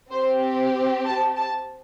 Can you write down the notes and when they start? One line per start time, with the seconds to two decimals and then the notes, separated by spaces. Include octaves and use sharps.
0.11 C4 G4 C5
1.06 A5
1.37 A5